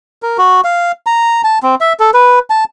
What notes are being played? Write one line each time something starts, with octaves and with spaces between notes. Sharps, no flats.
A#4
F#4
F5
A#5
A5
C4
E5
A4
B4
A5